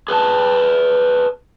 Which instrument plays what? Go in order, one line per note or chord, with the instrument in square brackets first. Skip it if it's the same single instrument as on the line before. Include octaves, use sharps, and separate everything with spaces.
[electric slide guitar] G#4 B4 F#5 A5